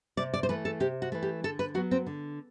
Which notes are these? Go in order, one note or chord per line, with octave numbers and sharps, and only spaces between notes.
C3 D5
D5
C5
E3 A3 B4
A4
C3 G4
F#4
E3 A3
G4
D3 A4
B4
F#3 B3 F#4
C4
D3